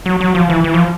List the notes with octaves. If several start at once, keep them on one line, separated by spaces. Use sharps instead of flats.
F#3
F#3
F3
E3
E3
F3